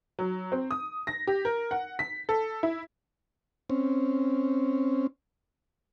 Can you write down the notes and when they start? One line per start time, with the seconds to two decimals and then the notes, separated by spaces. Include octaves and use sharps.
0.19 F#3
0.52 C4
0.71 D#6
1.07 A#6
1.27 G4
1.45 A#4
1.71 F#5
1.99 B6
2.29 A4
2.63 E4
3.70 C4 C#4